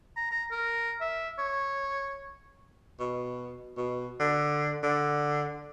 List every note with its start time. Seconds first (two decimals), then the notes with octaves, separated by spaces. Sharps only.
0.17 A#5
0.31 A#5
0.51 A#4
1.01 E5
1.39 C#5
3.00 B2
3.77 B2
4.19 D3
4.83 D3